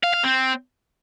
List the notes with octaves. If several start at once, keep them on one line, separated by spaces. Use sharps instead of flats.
F5
F5
C4